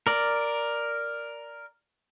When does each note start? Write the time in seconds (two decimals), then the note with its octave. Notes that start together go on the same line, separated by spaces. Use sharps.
0.07 A#4 D5